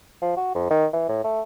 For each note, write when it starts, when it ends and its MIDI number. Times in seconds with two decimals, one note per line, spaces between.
0.22 0.35 53
0.37 0.52 66
0.55 0.67 41
0.70 0.86 51
0.93 1.06 52
1.09 1.23 45
1.24 1.41 57